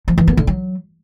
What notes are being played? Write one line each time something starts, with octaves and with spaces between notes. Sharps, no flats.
F3
E3
B3
D3
F#3